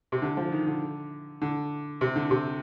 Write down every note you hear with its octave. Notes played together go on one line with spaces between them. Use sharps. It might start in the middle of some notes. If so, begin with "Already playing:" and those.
C3
D3
F3
D#3
D3
D3
C3
D3
C3